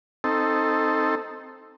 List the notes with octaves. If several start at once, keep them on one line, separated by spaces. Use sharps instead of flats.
C4 D#4 A4